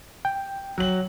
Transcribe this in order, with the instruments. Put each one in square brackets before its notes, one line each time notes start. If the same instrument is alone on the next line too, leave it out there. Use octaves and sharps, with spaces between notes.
[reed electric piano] G5
[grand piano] F#3 F#7